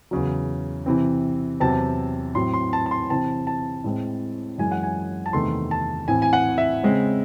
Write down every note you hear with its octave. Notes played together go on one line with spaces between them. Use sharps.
E2 C#3 F#3
C3 E3 C4
E2 C3 F#3 C4 A5
A2 F#3 C4 C6
C6
A5
A5
C6
C3 E3 C4 A5
A5
A2 G#3 C4
F#2 E3 G#3 G#5
F#5
G#5
A5
E2 C3 D#3 A3 C6
A5
A2 E3 C4 G#5
G#5
F#5
E5
C#3 G#3 C4